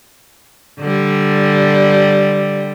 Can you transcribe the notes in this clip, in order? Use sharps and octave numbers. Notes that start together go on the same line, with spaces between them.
D3 G3